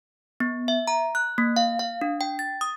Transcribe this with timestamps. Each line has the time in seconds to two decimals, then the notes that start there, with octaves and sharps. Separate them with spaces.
0.40 B3
0.68 E5
0.87 A#5
1.15 F#6
1.38 A#3
1.56 F5
1.79 F5
2.01 D4
2.21 G5
2.39 A6
2.61 D#6